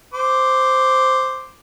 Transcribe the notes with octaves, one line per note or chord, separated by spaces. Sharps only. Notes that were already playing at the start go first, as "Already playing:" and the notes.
C5 D6